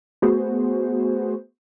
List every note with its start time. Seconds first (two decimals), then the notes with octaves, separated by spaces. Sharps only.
0.22 A3 B3 F#4 G#4 C5